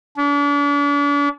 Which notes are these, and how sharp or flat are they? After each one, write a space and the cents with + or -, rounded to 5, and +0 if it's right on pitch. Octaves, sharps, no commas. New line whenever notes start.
D4 -40